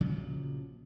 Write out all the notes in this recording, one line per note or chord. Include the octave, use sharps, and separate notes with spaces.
A#1 C#3 F3 F#3